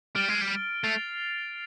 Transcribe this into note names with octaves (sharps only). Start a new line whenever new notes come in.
G3 F6 A6 D7 G7
G#3
G3
A3 A6 C7 F7